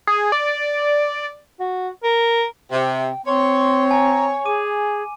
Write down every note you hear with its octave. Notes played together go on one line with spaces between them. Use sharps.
G#4
D5
F#4
A#4
C3 G5
C4 C#5 C6
G#5 A#5
G#4 D6 D#7